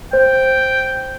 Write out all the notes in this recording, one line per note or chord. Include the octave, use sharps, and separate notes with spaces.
C5 G5